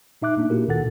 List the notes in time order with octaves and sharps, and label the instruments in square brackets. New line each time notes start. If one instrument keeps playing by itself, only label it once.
[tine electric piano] A#2 D#4 E5 D6 F#6
A#2 A#3 D4
A#3 E4 F#4 G4 A#4
D2 A#2 D#3 A4 F#5 A6